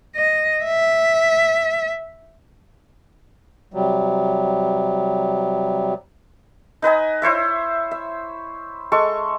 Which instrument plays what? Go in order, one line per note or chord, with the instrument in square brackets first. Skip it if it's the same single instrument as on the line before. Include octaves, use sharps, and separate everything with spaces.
[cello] D#5
E5
[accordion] C3 F#3 G3
[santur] D#4 B4 D#5 G#5
E4 C5 C#5 E5
E5
G#3 A4 C#6